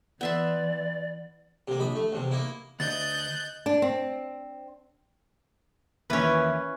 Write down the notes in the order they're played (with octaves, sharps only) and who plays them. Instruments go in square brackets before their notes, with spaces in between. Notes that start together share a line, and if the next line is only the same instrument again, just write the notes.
[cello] E3 [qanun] B3 E5 C6 [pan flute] D5
[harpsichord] C3 A#3
A#1 B5 D#6
A3
E2 C3
A#3 D#4 E4
[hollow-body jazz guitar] D2 [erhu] D#5 [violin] F#6 G6 [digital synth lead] A6
[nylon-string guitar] D4
C4
[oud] D#2 E3 [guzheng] C#4 B4